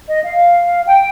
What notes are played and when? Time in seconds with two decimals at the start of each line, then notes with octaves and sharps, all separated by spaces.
0.08 D#5
0.24 F5
0.87 G5